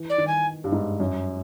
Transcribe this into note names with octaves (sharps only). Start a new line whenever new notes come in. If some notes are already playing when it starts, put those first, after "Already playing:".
Already playing: E3
D5
D#3
G#5
G2
G#2
F#2